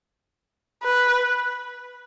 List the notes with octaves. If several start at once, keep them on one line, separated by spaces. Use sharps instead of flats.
B4